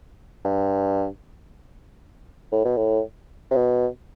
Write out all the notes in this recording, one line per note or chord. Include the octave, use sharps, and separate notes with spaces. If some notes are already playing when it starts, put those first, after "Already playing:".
G2
A2
B2
A2
C3
B2